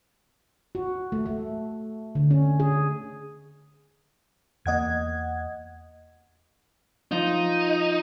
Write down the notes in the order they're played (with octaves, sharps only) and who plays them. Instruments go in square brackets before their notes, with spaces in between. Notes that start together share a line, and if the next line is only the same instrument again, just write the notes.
[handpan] F#4
A3
A3
D3
C#4
G#4
[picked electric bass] E2 A#3 [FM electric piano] D#5 F#5 G#6
[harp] F3 [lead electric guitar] D#4